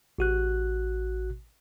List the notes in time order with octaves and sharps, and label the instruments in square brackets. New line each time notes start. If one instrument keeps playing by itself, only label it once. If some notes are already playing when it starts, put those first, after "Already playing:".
[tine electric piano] A1 F#4 F#6